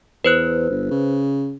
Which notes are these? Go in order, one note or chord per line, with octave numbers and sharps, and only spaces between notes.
E2 B4 C5 F#6
G1
C#3